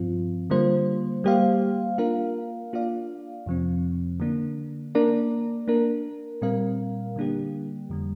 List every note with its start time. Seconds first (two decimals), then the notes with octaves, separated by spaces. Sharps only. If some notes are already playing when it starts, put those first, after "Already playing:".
Already playing: G2 F3 C4 F4
0.50 D3 G3 A#3 F4 C5
1.24 G3 A#3 G4 C5 F5
1.98 A#3 D4 F4 A#4 F5
2.73 A#3 D4 F4 D5 F5
3.46 F2 C3 F3 C4
4.20 D3 A#3 D4
4.95 A#3 D4 A#4 D5
5.68 A#3 D4 A#4
6.42 A#2 G3 C4 A#4 F5
7.16 D3 G3 A#3 D4 G4
7.89 F2 D3 G3